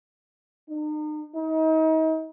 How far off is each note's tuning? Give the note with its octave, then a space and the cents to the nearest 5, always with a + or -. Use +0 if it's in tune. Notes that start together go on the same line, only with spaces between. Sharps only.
D#4 -40
D#4 +35